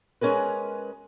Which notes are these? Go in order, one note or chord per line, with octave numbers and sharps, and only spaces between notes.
G#3 C#4 G#4 A#4 B4